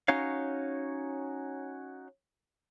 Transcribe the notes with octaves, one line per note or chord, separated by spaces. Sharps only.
C#4 D#4 F#4 C#5 F5